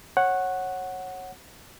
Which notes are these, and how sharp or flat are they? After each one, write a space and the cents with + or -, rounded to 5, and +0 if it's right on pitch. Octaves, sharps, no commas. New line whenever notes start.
C#5 -20 F#5 +0